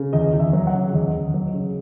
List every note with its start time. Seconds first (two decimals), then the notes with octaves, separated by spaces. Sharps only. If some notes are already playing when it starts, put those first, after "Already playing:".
Already playing: C#3
0.13 E2 D#5
0.33 E2
0.40 E5
0.53 F#3
0.67 F#5
0.74 C#3
0.94 E2 D#5
1.13 E2
1.34 F#3
1.54 C#3